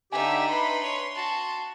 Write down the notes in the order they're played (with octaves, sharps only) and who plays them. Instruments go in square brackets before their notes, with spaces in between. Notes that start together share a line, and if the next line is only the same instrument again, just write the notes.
[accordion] D3 G4 [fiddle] D4 D#4 [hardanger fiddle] E5 [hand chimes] G#5
[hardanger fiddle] B4 B5 [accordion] C6
[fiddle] C#5
[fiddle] F#4 [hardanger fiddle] A5